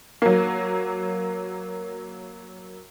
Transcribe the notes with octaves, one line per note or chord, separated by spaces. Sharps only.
F#3 A#3